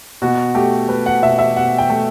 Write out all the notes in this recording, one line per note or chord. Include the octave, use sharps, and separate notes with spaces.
B2 F#4
A3 G4
A3 B4
F#5
B2 E5
E5
B2 F#5
G5
A3